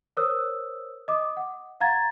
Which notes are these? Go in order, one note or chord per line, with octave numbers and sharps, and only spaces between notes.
A#4 C5 C#5 D#6 E6 F#6
D#5 D6 D#6
F#5
F5 F#5 A#5 G#6 A6